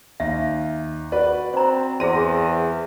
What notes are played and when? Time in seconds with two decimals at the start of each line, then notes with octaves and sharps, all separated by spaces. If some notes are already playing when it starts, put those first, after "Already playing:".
0.20 D#2 E5
1.12 F#4 B4 D5
1.54 C4 C5 A#5
2.00 E2 G#4 C5 C6 A#6 D#7